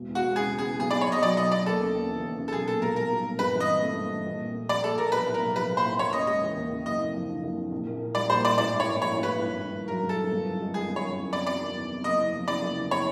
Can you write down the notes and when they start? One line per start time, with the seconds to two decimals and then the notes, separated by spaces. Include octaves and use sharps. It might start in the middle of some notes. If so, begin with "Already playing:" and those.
Already playing: E1
0.08 E2
0.15 F#4
0.22 E1
0.36 C#3 G#4
0.50 E1
0.58 G#4
0.65 E2
0.79 B1 G#4
0.91 D5
0.94 B2
1.01 C#5
1.08 B1 D#5
1.23 F#3 D5
1.37 B1 D#5
1.51 B2 D5
1.66 D#2 A4
1.81 C#3
1.95 D#2
2.09 E3
2.24 D#2
2.38 C#3
2.48 A4
2.52 B1 G#4
2.67 A#2 A4
2.81 B1 A#4
2.96 G3 A#4
3.11 B1
3.24 A#2
3.39 G2 B4
3.53 E3
3.60 D#5
3.68 C4
3.82 A3
3.97 G2
4.11 E3
4.26 A#1
4.40 A#2
4.54 A3
4.68 F3 D5
4.84 A#1 A4
4.98 A#2 A#4
5.12 B1 B4
5.27 A2
5.34 A#4
5.41 B1
5.56 F3 B4
5.70 B1
5.77 C5
5.84 A2
5.99 D#2 C#5
6.13 C#3 D#5
6.27 G#3 D#5
6.42 E3
6.56 D#2
6.71 C#3
6.86 F#1 D#5
6.99 F2
7.14 F3
7.29 D3
7.43 F#1
7.57 F2
7.72 A#1
7.87 A#2
8.01 A#3
8.15 G3 D5
8.30 A#1 C5
8.45 A#2 D5
8.58 A1 D5
8.72 G#2
8.80 C#5
8.88 A1
9.02 F3 C#5
9.17 A1
9.23 B4
9.30 G#2
9.46 G2
9.60 D#3
9.74 A#3
9.88 F#3 A#4
10.03 G2
10.09 A4
10.16 D#3
10.32 G1
10.45 F#2
10.60 G#3
10.74 D#3 G#4
10.89 G1
10.96 C#5
11.04 F#2
11.18 E2
11.33 C3 D5
11.47 F#3 D5
11.61 D#3
11.76 E2
11.90 C3
12.04 F#1 D#5
12.18 E2
12.33 F3
12.47 C#3 D5
12.62 F#1
12.76 E2
12.91 C#5